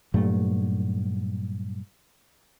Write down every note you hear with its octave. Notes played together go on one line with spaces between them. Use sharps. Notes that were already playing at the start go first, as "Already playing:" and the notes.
G2 A#2 F#3 A3